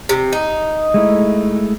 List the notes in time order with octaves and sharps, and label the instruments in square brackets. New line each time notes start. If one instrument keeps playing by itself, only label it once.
[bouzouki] C3
D#4
[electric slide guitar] G#3 A3 E4